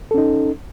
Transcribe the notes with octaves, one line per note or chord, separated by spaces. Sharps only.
C#4 D#4 A4